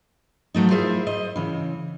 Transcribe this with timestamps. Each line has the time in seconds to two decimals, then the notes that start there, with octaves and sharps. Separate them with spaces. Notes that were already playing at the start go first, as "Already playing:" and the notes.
0.54 F3 F#3 A3 D#4
0.70 E4 F4 G#4 C5 E5
1.07 C5 D#5
1.36 C#3 E3